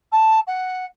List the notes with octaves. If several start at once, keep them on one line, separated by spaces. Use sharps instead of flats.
A5
F#5